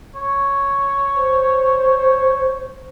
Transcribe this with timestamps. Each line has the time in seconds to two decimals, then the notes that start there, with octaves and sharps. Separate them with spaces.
0.15 C#5
1.16 C5